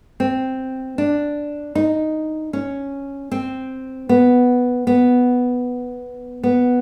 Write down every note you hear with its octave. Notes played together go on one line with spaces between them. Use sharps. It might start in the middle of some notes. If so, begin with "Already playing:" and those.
C4
D4
D#4
C#4
C4
B3
B3
B3